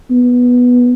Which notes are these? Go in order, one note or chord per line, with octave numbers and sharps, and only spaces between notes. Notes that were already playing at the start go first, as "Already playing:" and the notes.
B3